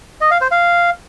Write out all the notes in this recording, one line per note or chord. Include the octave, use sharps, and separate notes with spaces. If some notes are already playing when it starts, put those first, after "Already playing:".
D#5
F5
C5
F5